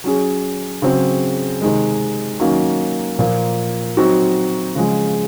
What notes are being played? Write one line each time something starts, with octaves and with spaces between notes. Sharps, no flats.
F#3 C#4 G#4
C#3 F#3 C4
C3 D#3 G#3
D#3 F#3 A#3 C#4
A#2 F3 A#3
F#3 C4 D#4 F#4
C#3 F3 G#3